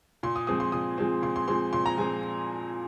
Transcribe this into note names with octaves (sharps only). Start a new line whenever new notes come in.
A#2 C6
D#6
F3 G#3 C4 D#6
C6
A#2 D#6
F3 G#3 C4
A#2 C6
C6
F3 G#3 C4 C6
A#2 C6
A#5
F3 G#3 C4 G#5